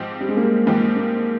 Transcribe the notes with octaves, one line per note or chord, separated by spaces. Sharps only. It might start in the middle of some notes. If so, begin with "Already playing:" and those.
Already playing: G#2 F3 C4 G4
G3
G#3
A#3
G#2 F3 A#3 C4 G4
A#3